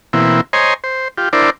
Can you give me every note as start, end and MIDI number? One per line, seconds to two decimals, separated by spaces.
0.13 0.41 47
0.13 0.41 52
0.13 0.41 58
0.13 0.41 60
0.13 0.41 64
0.53 0.74 72
0.53 0.74 73
0.53 0.74 75
0.53 0.74 80
0.53 0.74 82
0.53 0.74 84
0.84 1.08 72
1.18 1.29 65
1.18 1.29 67
1.33 1.50 62
1.33 1.50 64
1.33 1.50 70
1.33 1.50 72
1.33 1.50 74